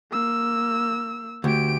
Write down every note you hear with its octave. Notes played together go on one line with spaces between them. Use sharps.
A#3 E6
D2 G4 D7